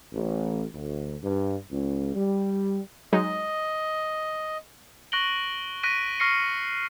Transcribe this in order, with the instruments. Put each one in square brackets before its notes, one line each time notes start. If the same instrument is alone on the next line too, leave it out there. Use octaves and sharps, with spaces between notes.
[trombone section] A1
D2
G2
C#2
G3
[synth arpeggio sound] F#3 G#3 D#4 [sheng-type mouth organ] D#5
[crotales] C#6 F#6 A#6 D7 F#7 G7
C#6 F#6 A#6 B6 D7 D#7
C#6 F6 A#6 C7 C#7